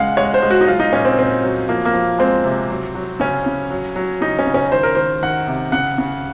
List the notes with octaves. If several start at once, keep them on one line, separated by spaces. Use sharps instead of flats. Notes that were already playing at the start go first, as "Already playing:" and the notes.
Already playing: C#3 G#3 F5 F#5
G#3 C#5
C5
G#3
F#4
D#4
F#3 F4
D#4
A#2 C#4
C4
A#2 C4
F#3
F3 A#3
A#3
F3
G#3 C4
C3
F#3
F#3
C#3 C#4
C#3
F#3
F#3
C#3 D#4
C#4
C#3
C#4
D#3 C5
A#4
D#3 C5
D#3 F#5
C3
C#3 F#5
C#3